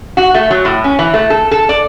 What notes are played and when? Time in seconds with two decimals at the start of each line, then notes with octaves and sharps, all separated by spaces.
0.17 F#4
0.34 A3
0.50 F#3
0.65 A2
0.84 C#4
0.99 E3
1.14 A3
1.30 A4
1.51 A4
1.69 D5